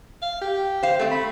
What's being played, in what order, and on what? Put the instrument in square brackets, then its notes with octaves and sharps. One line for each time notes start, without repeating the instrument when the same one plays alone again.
[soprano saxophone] F5
G4
[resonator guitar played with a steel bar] C5 F5
A3 C4
[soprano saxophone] B5